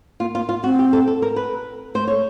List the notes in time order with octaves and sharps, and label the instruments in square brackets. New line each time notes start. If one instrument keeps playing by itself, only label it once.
[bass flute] A#3 [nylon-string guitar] F4
[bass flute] A#3 [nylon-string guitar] F4
[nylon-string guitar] F4
[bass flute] C4 [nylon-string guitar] F#4
[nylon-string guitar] G4
A4
A4
A#4
B4
[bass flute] A3 [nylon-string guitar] C5
[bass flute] A3 [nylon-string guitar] C#5